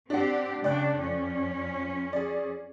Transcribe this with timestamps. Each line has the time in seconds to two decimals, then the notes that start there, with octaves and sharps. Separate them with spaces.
0.10 C4 D4 G4 D5 F#5
0.64 C#3 D4 D5 G5 F#6
0.98 F2 C#4
2.13 G#4 D5